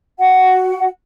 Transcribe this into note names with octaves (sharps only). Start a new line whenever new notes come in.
F#4 F#5